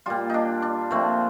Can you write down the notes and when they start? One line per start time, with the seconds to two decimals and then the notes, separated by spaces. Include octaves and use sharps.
0.06 A#2 G3 F4
0.30 D4 D#4
0.62 D4
0.91 A#2 F3 A3 C4